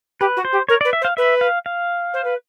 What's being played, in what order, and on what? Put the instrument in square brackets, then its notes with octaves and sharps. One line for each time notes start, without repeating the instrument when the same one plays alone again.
[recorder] G4 [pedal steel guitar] B4
[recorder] F#4
[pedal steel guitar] C5
[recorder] G4
[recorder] A#4 [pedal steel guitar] C#5
[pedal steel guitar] D5
[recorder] B4
[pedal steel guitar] E5
[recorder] C5
[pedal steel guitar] F5
[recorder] B4 [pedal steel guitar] E5
[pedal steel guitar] F5
F5
[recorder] C5
B4